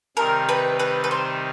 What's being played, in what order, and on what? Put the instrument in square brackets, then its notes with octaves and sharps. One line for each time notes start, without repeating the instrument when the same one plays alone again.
[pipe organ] C3 D#3 G3 C4 D#4 [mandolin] A#4
[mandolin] B4
B4
B4
C5